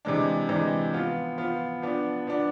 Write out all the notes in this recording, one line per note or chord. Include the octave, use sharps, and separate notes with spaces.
C3 E3 G#3 D4
C3 E3 G#3 D4
F3 B3 F4
F3 B3 F4
F3 B3 D4
F3 B3 D4